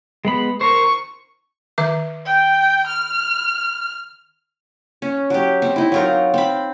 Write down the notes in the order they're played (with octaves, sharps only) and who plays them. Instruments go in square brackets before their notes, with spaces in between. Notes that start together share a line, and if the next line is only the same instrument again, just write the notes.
[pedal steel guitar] G#3 B3 B5
[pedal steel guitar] A#4 C5 [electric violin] C#6
[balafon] D#3 E5 D6
[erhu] G5
F6
[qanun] C#4
F#3 G4
C4
D#4 E4
F#3 F4 A#4
C4 B5